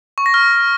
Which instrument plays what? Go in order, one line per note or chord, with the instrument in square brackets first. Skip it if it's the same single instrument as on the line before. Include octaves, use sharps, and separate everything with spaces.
[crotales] C#6
A#6
F6